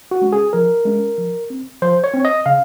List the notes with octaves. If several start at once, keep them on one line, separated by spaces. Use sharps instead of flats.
F#4
G#3 C#4
G#4
F3 A#4
G#3 C#4
F3
C4
F3 C5
C#5
C4
D#5
C#3 F5